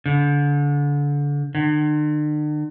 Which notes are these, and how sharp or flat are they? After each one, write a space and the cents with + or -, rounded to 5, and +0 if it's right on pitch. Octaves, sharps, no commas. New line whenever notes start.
D3 -30
D3 +45